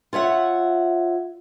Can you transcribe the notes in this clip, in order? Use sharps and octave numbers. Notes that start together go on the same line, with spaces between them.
F4 C#5 E5 F#5